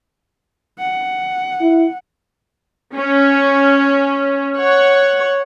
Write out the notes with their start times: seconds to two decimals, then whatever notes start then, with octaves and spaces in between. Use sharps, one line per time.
0.79 F#5
1.61 E4
2.95 C#4
4.56 C#5 F#5